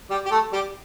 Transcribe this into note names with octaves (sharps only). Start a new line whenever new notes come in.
G3 G4
G4
A3 A4
G3 G4